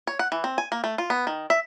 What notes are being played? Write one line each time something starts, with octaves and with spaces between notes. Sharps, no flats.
C#5
F#5
E3
C4
G#5
A#3
A3
F4
B3
D#3
E5